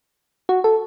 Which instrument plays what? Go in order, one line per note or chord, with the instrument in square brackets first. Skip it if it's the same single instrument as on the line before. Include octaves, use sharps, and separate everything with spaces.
[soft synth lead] F#4
A4